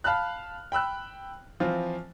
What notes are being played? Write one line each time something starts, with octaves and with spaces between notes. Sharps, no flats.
F5 A5 B5 F6 F#6
G5 B5 E6 F#6
E3 F3 C4 F4